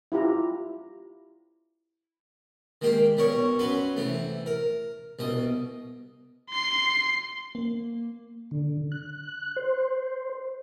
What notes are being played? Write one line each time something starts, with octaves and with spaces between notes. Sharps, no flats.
E4 F4 G4 A#5
D#3 G#3 A#3 G4
B1 G3 A#4 C#5 C#6
F#3 C#4 B4 C6
C3 E3 A3
A#4
C2 B2 D#5
C6 C7
A#3
D3
F#6
C5